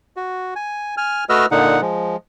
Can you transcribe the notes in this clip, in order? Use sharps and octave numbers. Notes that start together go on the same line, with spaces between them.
F#4
G#5
G#5 F6
A3 F#4 B4 D#5 E6 F6
A#2 D3 D#4 F#5
F3 G#3